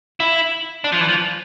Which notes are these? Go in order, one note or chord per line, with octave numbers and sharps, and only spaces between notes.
E4
D4
F3
E3
F3